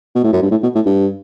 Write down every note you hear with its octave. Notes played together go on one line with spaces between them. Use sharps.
B2
A2
F#2
G2
A2
B2
A2
G2